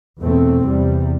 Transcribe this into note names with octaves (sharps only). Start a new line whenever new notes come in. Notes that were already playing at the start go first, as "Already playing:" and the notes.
E2 B2 A3 C4
E2 C3 G3